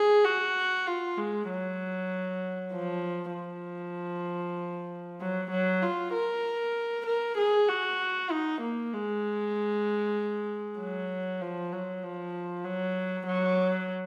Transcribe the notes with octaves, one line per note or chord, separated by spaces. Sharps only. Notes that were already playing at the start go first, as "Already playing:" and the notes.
Already playing: G#4
F#4
F4
G#3
F#3
F3
F3
F#3
F#3
F4
A#4
A#4
G#4
F#4
D#4
A#3
G#3
F#3
F3
F#3
F3
F#3
F#3